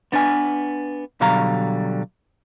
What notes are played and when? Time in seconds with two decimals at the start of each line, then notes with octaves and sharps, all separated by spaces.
0.12 B3 D4 B4 G#5
1.21 B2 D3 F#3 G3 F5 A#5